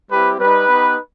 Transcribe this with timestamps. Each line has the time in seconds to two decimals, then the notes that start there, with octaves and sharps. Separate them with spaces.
0.11 G3 C4 E4 G4 B4
0.39 G3 D#4 G4 B4
0.68 B3 D#4 G4